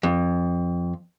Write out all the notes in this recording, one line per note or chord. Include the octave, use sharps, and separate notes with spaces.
F2